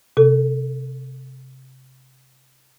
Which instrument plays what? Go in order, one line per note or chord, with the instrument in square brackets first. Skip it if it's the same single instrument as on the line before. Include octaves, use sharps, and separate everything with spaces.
[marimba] C3 A4